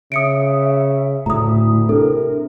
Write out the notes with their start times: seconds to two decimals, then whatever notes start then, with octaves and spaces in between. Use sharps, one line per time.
0.12 C#3 E5 D#6 C#7 D7
1.26 D2 A2 E4 A#5 D#6
1.89 C3 D4 A4 A#4